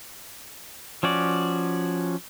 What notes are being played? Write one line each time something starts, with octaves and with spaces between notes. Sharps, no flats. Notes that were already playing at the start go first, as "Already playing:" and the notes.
F3 C#4 F#4 D5